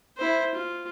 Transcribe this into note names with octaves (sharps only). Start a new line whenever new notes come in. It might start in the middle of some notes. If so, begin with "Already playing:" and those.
E4 C5
F4